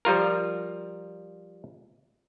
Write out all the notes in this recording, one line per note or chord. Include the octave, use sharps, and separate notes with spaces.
F3 G3 F4 A#4